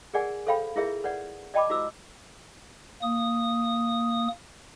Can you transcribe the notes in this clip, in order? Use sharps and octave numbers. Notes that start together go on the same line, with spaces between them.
G#4 A#4 D5 F#5 G#5
A4 C5 C#5 F5 G5 B5
E4 F4 G#4 A#4 C#5 E5
B4 C#5 D5 F#5
D5 D#5 G5 A5 B5 D6
E4 F#4 G4 B4 D6 E6
A#3 D#6